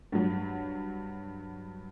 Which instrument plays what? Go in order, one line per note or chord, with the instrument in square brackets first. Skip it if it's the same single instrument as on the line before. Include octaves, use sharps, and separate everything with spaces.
[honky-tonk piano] G2 F#3